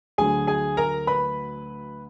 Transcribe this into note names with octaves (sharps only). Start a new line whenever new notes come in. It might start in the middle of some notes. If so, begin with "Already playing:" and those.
D2 D3 F#3 G#4 G#5
G#4 G#5
A#4 A#5
B4 B5